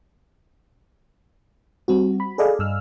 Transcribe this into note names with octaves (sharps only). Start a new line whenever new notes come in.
G3 C4 F#4
B5
G#4 A4 D5 D#5 F5 G#5
G2 E6 F6